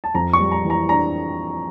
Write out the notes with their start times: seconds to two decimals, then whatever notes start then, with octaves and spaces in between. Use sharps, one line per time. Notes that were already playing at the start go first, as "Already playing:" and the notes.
0.04 A5
0.14 F2 A#5
0.33 C#6
0.39 G3
0.52 A#5
0.65 E3
0.70 A#5
0.89 D4 A#5